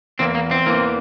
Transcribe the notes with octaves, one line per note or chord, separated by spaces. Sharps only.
E2 E3 A#3 C4
A#3
C4
E2 E3 A#3